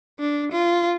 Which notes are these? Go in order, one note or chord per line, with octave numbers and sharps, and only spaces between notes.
D4
F4